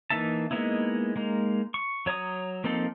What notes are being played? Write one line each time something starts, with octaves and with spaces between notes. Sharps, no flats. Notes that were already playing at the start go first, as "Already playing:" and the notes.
E3 A#3 D#4 E5 A5
G#3 A#3 B3 D#4 E4
G#3 A#3 D#4
C#6
F#3 C#5 A#5 D#6
F3 A#3 C4 D#4 A4